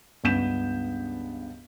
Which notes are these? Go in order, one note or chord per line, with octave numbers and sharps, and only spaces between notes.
C#2 G2 B3 G6 B6 E7